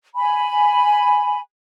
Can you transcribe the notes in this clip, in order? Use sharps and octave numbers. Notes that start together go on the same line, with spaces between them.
G#5 B5